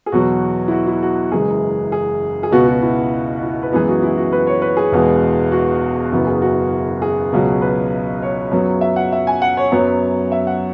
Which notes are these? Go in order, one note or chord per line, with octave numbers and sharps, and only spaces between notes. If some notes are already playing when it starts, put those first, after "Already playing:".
G#4
E2 B2 F#3 F#4
E4
F#4
E4
F#4
F#1 F#2 E3 G#3 G#4
G#4
G#4
C#2 B2 B3 F#4
F#4
E4
E4
B4
F#2 E3 G#3 B3 G#4
F#4
E4
F#4
B4
C#5
B4
G#4
E1 E2 B2 G#3 B3
F#4
F#1 F#2 E3 B3 F#4
G#4
F#4
G#4
C#2 B2 F#3
B4
C#5
F#2 F#3 B3
E5
F#5
E5
G#5
F#5
C#5
F#2 F#3 B3 C#5
E5
F#5